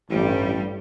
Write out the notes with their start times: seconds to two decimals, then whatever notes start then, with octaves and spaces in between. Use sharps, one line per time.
0.10 A1 G2 G3